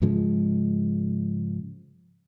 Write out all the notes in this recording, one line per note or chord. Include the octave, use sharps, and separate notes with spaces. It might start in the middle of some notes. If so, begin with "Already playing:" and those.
G#2 C#3 F3 G#3